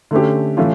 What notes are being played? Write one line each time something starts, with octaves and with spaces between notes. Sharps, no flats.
D3 A3 C#4 G4
A2 E3 A3 C#4 F4